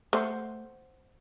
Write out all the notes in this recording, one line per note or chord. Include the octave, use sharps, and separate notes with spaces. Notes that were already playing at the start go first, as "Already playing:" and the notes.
A3 C5 F#5 C6